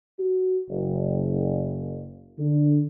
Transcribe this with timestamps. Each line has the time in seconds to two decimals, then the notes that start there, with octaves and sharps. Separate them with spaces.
0.19 F#4
0.70 F#1
2.39 D3